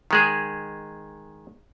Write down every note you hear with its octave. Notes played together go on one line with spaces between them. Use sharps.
D#3 G#3 G#4